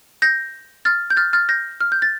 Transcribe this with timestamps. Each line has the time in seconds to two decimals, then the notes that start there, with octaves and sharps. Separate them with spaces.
0.22 G6 A#6
0.85 F6 A6
1.10 G6
1.17 F6 A6
1.33 F6 A6
1.49 G6 A#6
1.81 F6
1.92 G6
2.02 A6